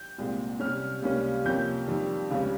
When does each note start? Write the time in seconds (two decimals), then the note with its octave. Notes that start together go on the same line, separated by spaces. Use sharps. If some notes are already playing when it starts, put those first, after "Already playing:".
Already playing: G6
0.18 C2 A#2 G#3 C4
0.60 C3 G3 C#4 F6
1.02 C#2 C3 G3 A#3 C#4
1.45 F2 C3 F3 A#3 C#4 G6
1.87 F2 D#3 G3 C4
2.30 C#2 C#3 G3 C#4